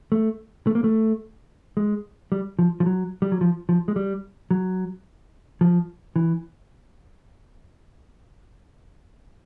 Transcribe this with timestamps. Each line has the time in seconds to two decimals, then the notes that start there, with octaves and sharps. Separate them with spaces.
0.12 A3
0.67 A3
0.75 A#3
0.84 A3
1.77 G#3
2.32 G3
2.59 F3
2.80 F3
2.86 F#3
3.22 G3
3.32 F#3
3.41 F3
3.69 F3
3.88 G#3
3.96 G3
4.51 F#3
5.61 F3
6.16 E3